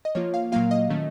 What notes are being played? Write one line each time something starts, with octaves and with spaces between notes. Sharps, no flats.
D#5
F3 A#3 F4 C#5
F5
A#2 F#3 A#3 F4 F5
D#5
D#3 A3 C#4